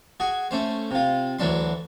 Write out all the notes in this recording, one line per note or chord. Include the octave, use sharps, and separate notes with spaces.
F#4 G#4
A3 C#4 C5
C3 F4
D2 E3 F#3 D4 C6